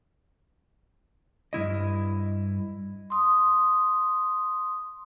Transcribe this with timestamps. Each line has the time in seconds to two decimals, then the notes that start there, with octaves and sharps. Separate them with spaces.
1.53 G2 F3 E4 D#5
3.10 C6 D#6